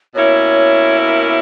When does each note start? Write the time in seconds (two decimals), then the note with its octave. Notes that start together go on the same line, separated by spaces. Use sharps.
0.15 B2 A#3 C#4 E4 C#5
1.07 A#4